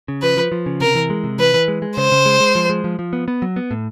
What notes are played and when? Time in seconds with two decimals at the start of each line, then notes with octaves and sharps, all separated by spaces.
0.08 C#3
0.22 F3 B4
0.37 F3
0.52 F3
0.66 C#3
0.80 C3 A#4
0.95 E3
1.10 G#3
1.24 C3
1.38 E3 B4
1.54 E3
1.68 G#3
1.82 G#3
1.97 C#3 C5
2.12 C#3
2.26 G#3
2.40 G#3
2.55 F3
2.70 G#3
2.84 F3
2.99 F3
3.13 B3
3.28 B3
3.42 F#3
3.56 B3
3.71 A2